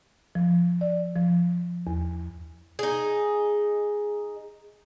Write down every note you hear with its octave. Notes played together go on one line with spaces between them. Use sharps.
F3
D5
F3
E2
D#4 G#4